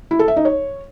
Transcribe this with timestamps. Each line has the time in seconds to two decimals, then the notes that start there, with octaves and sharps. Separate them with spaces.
0.11 E4
0.19 A4
0.28 E5
0.36 D#4
0.45 C#5